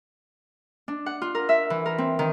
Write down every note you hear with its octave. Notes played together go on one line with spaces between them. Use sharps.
D4
F#5
F4
A#4
E5
E3
A#4
C4
D#3